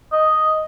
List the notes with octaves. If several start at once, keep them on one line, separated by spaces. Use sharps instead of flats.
D#5